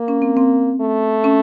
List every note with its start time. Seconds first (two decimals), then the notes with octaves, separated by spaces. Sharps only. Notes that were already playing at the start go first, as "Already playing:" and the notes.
Already playing: A#3
0.08 C#4
0.22 C4
0.37 C4
0.81 A3
1.24 C#4